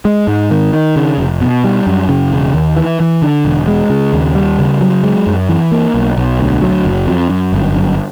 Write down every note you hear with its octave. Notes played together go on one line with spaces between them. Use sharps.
G#3
G#2
D#3
D#3
C#3
F1
B2
G3
F#2
C#3
E1
D#2
E3
E3
D3
E1
G#3
C#3
D#2
G3
C#3
F#3
G#3
F#2
E3
A#3
B1
B1
D2
F#3
F#1
F2
F#2
G1
F#2